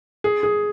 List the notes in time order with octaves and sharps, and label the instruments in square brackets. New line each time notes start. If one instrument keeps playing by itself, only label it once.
[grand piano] G#4
G#4